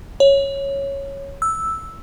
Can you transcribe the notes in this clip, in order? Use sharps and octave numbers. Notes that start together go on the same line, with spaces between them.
C#5
E6